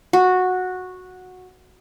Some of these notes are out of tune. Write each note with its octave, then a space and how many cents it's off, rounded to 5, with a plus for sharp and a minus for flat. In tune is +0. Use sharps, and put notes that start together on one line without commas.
F#4 -10